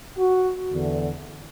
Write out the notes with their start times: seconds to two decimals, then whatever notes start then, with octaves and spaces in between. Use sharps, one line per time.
0.18 F#4
0.72 E2 D3